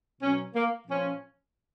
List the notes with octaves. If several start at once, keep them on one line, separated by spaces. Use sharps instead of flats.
B2 F#3 C#4
A#3
A#2 F3 C#4